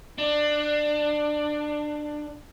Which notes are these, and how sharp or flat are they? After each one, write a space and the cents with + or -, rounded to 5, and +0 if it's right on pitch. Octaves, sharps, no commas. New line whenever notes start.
D4 +20